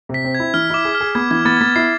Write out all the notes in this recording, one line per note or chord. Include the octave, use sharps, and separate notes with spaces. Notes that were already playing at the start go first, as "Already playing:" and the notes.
C3
B6
C4
G#6
E4
E3 F6
E4 D6
G#4
F6
G#4
B3 G#6
E3 G#6
B3 A6
G#6
B3 A6
E4 C7